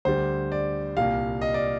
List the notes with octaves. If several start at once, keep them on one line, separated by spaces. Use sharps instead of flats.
D2 D3 G3 C5
D5
C2 A#2 G3 F5
D#5
D5